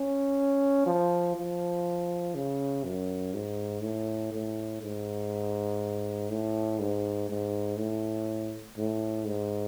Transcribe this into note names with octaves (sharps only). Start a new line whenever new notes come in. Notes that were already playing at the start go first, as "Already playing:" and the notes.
Already playing: C#4
F3
F3
C#3
F#2
G#2
A2
A2
G#2
A2
G#2
G#2
A2
A2
G#2